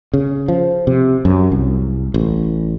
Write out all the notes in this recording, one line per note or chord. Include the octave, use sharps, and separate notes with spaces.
C#3
F3
C3
F#2
C2
A1